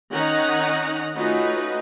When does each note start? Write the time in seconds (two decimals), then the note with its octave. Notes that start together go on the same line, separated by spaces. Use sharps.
0.12 D#3 C#4 D#4 F#5 A#5
1.15 A3 C#4 D#4 F4 F#4 B4